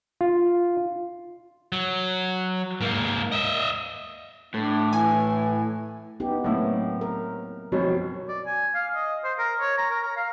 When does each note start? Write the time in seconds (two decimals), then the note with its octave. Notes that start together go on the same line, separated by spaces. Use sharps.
0.21 F4
1.72 F#3
2.81 G#2 A#3
3.32 D#5 E5
4.54 A2 D4
4.93 E3 G#5
6.20 B3 D#4 G4
6.44 A2 F#3 A#3 C4 E4
7.01 A#4
7.72 F#2 B2 F3 C4 C#5
8.29 D5
8.47 G#5
8.75 F5
8.95 D#5
9.24 C5
9.39 A#4
9.61 C#5
9.78 A#5
9.91 A#4
10.03 A#5
10.17 F5